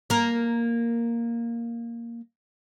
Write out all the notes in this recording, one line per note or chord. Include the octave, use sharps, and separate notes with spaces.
A#3 A#4